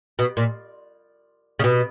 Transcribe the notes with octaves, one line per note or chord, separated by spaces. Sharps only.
B2
A#2
C#3
B2